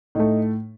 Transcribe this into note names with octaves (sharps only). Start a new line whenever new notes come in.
A2 A3 D#4